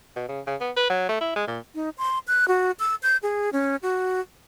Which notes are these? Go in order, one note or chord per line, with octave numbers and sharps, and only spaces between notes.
B2
C#3
C#3
B3
B4
F#3
A3
E4
G#3
A#2
D#4
C6
F#6
F#4
E6
G6
G#4
C#4
F#4